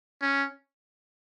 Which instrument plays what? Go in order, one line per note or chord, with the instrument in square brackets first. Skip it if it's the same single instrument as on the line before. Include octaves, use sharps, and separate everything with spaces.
[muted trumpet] C#4